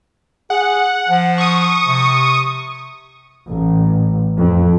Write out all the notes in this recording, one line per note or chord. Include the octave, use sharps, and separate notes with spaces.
G#4 F#5
F3
C#6 D#6
C3
A1
F2